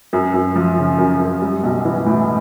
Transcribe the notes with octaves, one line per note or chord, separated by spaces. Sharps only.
F#2
F#2
F3
C#3
F#2
F#2
G3
B1
E3
A2